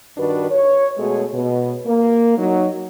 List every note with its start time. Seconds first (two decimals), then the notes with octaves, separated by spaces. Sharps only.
0.18 G2 D#3 D4 F#4 B4
0.51 C#5
0.97 B2 G#3 A3 F#4 G#4 C#5
1.33 B2
1.86 A#3
2.38 F#3 D#4